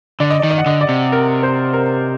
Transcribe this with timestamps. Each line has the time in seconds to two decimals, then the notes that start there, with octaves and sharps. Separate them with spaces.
0.20 D3 D5
0.30 D#5
0.39 D5
0.43 D#3
0.51 D#5
0.58 F#5
0.66 D3 D#5
0.81 D5
0.89 C3
1.12 A#4
1.43 C5
1.73 A#4